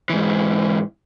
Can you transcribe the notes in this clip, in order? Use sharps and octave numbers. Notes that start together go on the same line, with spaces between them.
G#2 E3